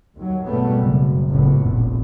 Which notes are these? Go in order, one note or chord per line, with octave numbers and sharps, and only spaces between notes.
D#2 F#3
G#1 F#2 B2 G3 A3 B3
F#1
F#1 C#2 A2 B3
F1 A#1